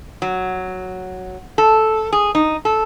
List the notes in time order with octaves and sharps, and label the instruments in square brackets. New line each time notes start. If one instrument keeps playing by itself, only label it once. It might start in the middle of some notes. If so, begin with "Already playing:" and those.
[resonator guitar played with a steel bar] F#3
A4
G#4
D#4
A4